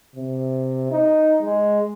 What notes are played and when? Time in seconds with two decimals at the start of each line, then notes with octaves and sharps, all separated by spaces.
0.16 C3
0.92 D#4
1.43 G#3